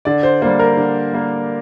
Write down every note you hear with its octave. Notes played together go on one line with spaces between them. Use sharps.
D3 D5
C5
G3 A#3 C5
A#4
D3
G3 A#3